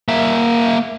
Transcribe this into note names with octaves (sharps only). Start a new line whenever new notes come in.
A#3 E5